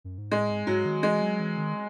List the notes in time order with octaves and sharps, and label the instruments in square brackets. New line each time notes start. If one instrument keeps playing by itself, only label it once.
[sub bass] F#2
G#2
[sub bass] A2 [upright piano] G#3
[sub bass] G#2
[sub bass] G#2 [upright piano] F#3
[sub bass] D#3
[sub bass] E3 [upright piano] G#3
[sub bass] F#3
E3
D#3